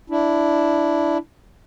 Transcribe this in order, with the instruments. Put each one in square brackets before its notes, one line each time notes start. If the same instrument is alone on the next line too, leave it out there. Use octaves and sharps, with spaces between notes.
[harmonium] D4 E4